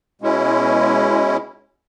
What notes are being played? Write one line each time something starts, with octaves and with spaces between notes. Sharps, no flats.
B2 G#3 C#4 E4